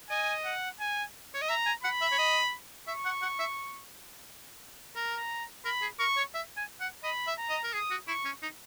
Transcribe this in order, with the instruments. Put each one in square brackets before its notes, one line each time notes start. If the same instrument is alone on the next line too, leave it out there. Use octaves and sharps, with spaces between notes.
[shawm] D#5 [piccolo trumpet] G#5
[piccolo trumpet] F#5
G#5
[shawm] C#5
D#5
[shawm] E5 [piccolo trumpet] A#5
[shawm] G#5
[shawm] F#5 [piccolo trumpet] B5
[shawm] E5
C#5
D#5
[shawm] E5 [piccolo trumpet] C#6
[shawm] F#5
F#5
E5
[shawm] A#4 [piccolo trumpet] A#5
[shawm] A#4 [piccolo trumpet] B5
[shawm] G#4
[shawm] A#4 [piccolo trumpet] C#6
[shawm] C#5
E5
G#5
F#5
[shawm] D#5 [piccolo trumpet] B5
[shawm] E5
[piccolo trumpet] A#5
[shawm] D#5
A#4
[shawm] G#4 [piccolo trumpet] D#6
[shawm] F#4
[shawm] E4 [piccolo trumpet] C#6
[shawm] C#4
D#4